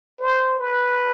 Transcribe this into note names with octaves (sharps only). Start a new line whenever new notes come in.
C5
B4